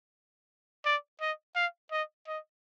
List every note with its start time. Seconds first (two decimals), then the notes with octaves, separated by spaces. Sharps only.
0.85 D5
1.21 D#5
1.55 F5
1.91 D#5
2.28 D#5